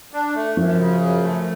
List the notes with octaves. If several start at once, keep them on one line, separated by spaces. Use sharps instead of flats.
D4
A3
F#2 F3
C#3
F#2
A3